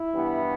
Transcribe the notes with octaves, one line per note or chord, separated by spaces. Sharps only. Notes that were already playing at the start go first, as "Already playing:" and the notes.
Already playing: E4
G2 E3 B3